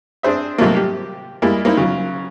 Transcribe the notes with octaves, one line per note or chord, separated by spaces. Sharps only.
C4 D4 G#4 C5 E5
G#2 C3 F#3 G3 A3 A#3
G4
G3 G#3 A#3 E4
A#3 C4 D#4 E4
C#3 F#3